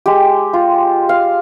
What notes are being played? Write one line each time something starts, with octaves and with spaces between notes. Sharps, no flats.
G#3 G4
F4
F5